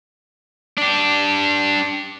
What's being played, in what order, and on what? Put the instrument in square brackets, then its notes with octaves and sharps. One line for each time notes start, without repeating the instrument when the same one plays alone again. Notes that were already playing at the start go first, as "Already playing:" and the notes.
[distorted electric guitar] D4 G4